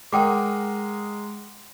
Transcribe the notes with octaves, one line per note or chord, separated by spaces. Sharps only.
G#3 A#4 F#5 G5 D6 D#6